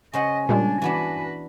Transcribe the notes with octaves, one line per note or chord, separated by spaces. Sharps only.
C#3 C5 D#5 F#5 G#5
A#2 G3 G#3 D4
E3 B3 D4 F#4 B4